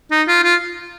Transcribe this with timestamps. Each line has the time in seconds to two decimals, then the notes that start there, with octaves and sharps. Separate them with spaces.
0.11 D#4
0.28 F4
0.44 F4